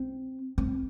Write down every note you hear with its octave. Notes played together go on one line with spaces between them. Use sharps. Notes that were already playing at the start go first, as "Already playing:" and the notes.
Already playing: C4
C4